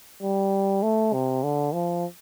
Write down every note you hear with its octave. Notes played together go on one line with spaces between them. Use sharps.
G3
A3
C3
D3
F3